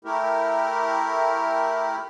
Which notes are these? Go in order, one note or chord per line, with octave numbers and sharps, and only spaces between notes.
A3 E4 G4 A#4